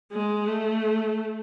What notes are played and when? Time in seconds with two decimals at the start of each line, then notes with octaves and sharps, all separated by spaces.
0.12 G#3
0.47 A3